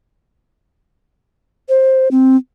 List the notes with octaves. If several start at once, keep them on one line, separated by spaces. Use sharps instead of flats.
C5
C4